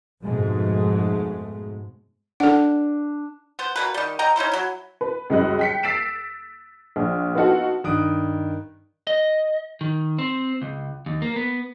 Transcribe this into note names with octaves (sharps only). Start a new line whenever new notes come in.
F2 G#2 B2 G#3 A3
D4 A4 F#5
B3 C5
B2 A#3 B4
D#3 G3
C3 D#5 G5 A#5
C#4 D#4 E4 C5
F#3 E4
B4
C#2 F#2 G3 D#5 F#6
G5 B6 C#7
E6 A6 B6 C7 D7 E7
A#1
B3 D#4 F4 F#4 A4 F#5
G2 D#3 D#6 F#6 D7
D#5
D#3
C4
C#2
D#2
A#3
B3